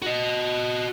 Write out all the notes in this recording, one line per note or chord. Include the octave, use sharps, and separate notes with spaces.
F#4 D#5